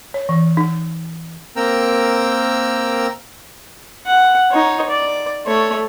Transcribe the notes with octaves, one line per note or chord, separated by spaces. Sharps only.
C#5
E3
D#4
A#3 C4 A#4 G5 A#5 E6
F#5
D#4 C#5
D5
A3 C#5